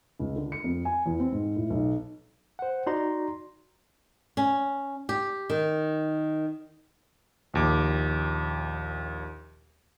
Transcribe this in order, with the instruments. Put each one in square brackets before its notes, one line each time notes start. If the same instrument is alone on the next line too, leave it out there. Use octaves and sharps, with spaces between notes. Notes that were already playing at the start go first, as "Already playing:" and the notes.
[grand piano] C#2
D3
C#7
F2
G#5
E2
C4
G#2
A2
B1
[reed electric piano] C5 F#5
D#4 F#4 D5 A#5 C6
[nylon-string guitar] C#4
G4
D#3
[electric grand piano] A#1 D#2 D6